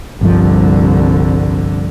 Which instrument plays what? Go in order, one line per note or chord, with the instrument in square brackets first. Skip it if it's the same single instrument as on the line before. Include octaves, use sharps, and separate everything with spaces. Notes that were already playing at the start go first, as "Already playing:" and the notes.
[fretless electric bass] G1 G2 F3 [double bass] C2 D3